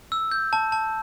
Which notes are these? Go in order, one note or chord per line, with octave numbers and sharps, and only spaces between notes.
E6
G6
A5
A5